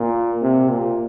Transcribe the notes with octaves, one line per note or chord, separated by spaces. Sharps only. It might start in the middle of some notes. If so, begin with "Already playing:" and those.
Already playing: A#2
C3
A#2